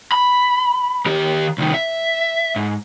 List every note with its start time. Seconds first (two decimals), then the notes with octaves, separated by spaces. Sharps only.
0.12 B5
1.06 D#3 G4
1.58 C2 D#3
1.74 E5
2.56 G#2